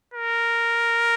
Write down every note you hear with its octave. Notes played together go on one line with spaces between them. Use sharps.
A#4